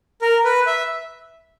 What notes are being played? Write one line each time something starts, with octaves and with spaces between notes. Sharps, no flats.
A#4
B4
E5